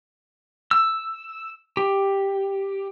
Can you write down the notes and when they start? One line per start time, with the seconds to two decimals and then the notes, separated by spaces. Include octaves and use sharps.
0.71 E6
1.77 G4